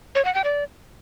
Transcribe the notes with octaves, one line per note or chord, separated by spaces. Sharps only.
C#5
F#5
G5
D5